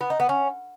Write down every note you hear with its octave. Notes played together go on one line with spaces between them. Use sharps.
B3
D#4
B3
C#4